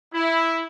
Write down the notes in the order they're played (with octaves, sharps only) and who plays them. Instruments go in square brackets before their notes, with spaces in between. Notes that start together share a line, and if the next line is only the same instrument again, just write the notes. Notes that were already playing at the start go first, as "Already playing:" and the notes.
[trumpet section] E4